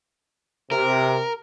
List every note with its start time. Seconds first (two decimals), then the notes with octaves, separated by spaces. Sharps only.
0.71 C3 A#4